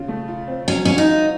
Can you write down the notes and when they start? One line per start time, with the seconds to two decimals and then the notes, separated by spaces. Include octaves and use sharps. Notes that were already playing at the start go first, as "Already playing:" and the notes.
Already playing: C#3 F4
0.08 A3
0.28 F4
0.48 C4
0.68 F#3 C#4
0.85 C#4 F4
0.98 D#4
1.07 F4